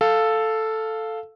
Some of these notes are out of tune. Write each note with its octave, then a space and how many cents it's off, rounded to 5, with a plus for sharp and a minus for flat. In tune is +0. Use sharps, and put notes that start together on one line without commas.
A4 +0 F5 +0